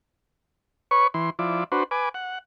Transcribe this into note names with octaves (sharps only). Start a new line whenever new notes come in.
B4 C#5 C#6
E3 C6
F3 E4 D5
D4 F#4 B4 C5
B4 G#5 D6
F#5